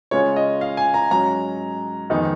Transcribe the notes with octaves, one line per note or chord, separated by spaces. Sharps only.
C#3 G#3 C#4 F4 C#5
D#5
F5
G#5
A#5
G#2 F#3 C#4 A#5
F2 D#3 G#3 B3 D#4